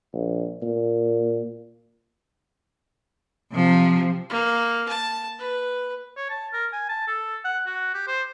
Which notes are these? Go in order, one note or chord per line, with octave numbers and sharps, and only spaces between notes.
A#1
A#2
C3 F3
A#3
A5
B4
C#5
A5
A#4
G#5
A5
A4
F#5
F#4
G4
C5